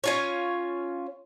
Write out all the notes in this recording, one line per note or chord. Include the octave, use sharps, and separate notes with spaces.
C#4 F4 C#5